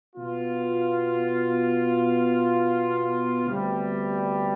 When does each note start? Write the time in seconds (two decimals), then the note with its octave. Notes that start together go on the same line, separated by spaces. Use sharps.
0.16 B2 B3 F4
3.46 D2 C3 G3 B3